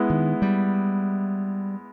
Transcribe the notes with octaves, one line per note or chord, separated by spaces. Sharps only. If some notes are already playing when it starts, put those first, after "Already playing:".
Already playing: G#3 B3 E4
D#3
G3